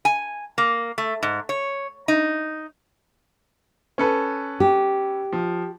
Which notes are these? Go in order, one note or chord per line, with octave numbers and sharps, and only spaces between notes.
G#5
A#3
A3
G#2
C#5
D#4
C#4 A4 B4
G4
F3